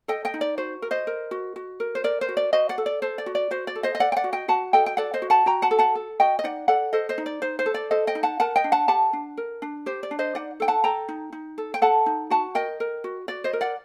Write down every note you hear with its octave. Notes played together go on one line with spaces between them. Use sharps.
A4 D#5 G5
D#5 G5
D#4
D5
F#4 C5
A#4
C5 D#5
A#4
F#4
F#4
A#4
C5
A#4 D5
C5
F#4
D5
F#4 C5 D#5
D5 F#5
A4
D5
A4 C5
D5
F#4
D5
F#4 C5
D5
A4
C5 D#5
D#5
A4 D5 F#5
G5
D5 F#5
F#4
D#5 G5
F#4 F#5 A5
A4 D#5 G5
G5
A4 D5 F#5
C5 D#5
F#4
F#5 A5
F#4 G5 A#5
F#5 A5
A4
F#5 A5
A4
F#4 D#5 G5
D#5
D#4 D5 F#5
A4 D5 F#5
A4 C5 D#5
C5 D#5
D#4
D5
D#4 C5
C5
A4
D5
A4 C5 D#5
D#5 G5
D#4
F#5 A5
A#4 F#5 A5
D#5 G5
D4
F#5 A5
G4 F#5 A5
D4
A#4
D4
G4 C5
D5
D4
C5 D#5
D#4 D5 F#5
A4 G5
F#5 A5
A4 G5 A#5
D#4
D#4
A4
G5
A4 F#5 A5
D#4
F#4 F#5 A5
A#4 D#5 G5
A#4
F#4
F#4 D5
C5 D#5
A#4
D5 F#5